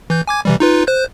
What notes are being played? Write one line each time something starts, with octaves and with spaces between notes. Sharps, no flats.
E3 G6
G#5 D6 G#6
C3 E3 G3
D#4 F4 B4
C5 F#6 G6